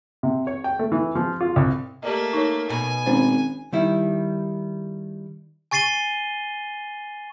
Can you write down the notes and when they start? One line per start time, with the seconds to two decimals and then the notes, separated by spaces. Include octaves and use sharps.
0.23 C3
0.47 C#5
0.64 G5
0.79 A3
0.92 E3
1.15 F3
1.41 F4
1.56 C2
2.03 A3 A#3 G4 D5 D#5
2.33 D#4 A#4 C#5
2.70 B2 G#5
3.06 G#1 C#4 C5
3.73 D#3 G3 E4
5.71 G#5 C#6 A6 C7 D#7 G7